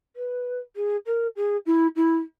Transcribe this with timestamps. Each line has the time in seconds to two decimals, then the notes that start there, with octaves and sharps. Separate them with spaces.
0.16 B4
0.76 G#4
1.06 A#4
1.36 G#4
1.66 E4
1.96 E4